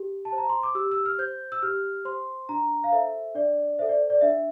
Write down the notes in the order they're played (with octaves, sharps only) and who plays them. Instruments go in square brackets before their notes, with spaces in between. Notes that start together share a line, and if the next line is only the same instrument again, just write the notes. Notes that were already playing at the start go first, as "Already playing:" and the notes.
Already playing: [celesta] G4
A5
C5
A#5
C6
D6
G4 E6
E6
F6
C5 G6
E6
G4 F6
C5 C6
D4 A#5
F5
A4 C5 E5
D4 D5
A4 C5 E5
D5
D5
D4 E5